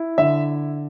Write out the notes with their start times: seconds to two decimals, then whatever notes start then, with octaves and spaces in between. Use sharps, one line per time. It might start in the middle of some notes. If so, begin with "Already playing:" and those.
Already playing: E4
0.18 D3 E5